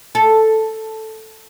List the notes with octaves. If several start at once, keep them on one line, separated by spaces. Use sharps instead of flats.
A4